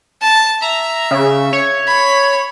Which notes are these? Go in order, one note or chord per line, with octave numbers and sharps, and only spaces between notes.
A5
E5 A#5
C#3
C#5
B5